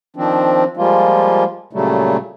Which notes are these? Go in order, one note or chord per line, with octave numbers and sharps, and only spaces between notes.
D#3 F3 C4 D4
F3 G3 G#3 A#3 F4
A#2 C#3 F#3 G3 A3